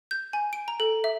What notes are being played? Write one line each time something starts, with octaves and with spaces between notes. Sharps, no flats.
G6
G#5
D7
A#5
A4
E5